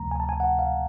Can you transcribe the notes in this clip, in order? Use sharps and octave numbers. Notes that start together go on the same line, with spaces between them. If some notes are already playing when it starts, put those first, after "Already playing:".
Already playing: D2 C3 F3 A3 A#5
G#5
A5
G#5
F#5
F5